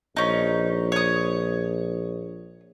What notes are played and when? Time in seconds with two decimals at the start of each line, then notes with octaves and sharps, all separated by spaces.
0.16 A#1 C#4 D#4
0.92 C#5 D#6